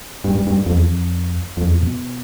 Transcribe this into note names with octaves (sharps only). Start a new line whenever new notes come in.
G2
G2
G2
F#2
F2
E2
F2
F2
E2
F2
B2